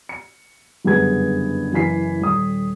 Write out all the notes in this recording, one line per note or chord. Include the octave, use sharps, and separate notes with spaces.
C#7
F#1 G2 D3 B3 G#4 G#6
F#1 E3 G#5 B6 C7
D#1 D#6